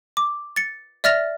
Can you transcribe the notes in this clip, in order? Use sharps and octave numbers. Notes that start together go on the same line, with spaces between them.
D6
A6 C#7
D5 E5 F6 A6 A#6 F7